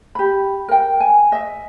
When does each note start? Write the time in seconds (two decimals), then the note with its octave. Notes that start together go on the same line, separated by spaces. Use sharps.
0.15 G4 B5
0.68 A#4 G5
1.00 G#5
1.32 D#5 E5